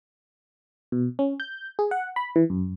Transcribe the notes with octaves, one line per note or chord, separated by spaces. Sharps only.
B2
C#4
G6
G#4
F#5
B5
E3
F#2